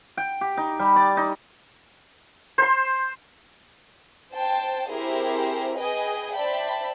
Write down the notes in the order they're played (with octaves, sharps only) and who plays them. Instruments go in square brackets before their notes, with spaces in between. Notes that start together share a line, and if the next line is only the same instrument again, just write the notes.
[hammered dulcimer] G5
G4
D#4
G3
D5
D#4
[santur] C5 C6
[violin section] C5 G5 A5
C4 E4 G4 G#4 A#4 C5
G#4 B4 D#5 G5 G#5
C5 D5 E5 G5 A5 B5